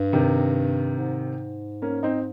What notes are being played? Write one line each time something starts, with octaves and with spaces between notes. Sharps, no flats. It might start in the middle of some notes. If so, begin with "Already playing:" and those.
Already playing: G2
C3 D#3
G#2
A#3 C#4
C4 D#4